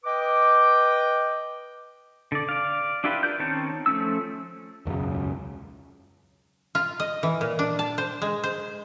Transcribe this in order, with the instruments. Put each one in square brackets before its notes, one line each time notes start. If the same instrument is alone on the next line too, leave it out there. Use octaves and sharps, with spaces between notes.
[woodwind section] B4 D#5 G5 D6
[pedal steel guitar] D3 D5
D5 F5
D4 E4 F4 G4 B4
A#4 D5 G6
D#3 C4 C#4 C#5 A5
F3 A3 C#4 E6
[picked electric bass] E1 C#2 F#2 C#3
[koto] F4
D#5
E3
A#2
D4
A5
C5
G#3
C5